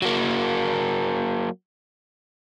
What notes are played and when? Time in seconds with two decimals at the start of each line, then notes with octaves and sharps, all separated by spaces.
0.02 F#3 A#3